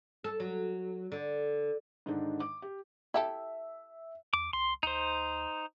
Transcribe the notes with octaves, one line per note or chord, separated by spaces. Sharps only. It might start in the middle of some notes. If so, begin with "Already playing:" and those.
A4
F#3
D3
G#2 D3 D#3 D4 D#4
D6
G4
E4 G4 A4 E5
E2 D6
C2 C6
D2 D#4 C5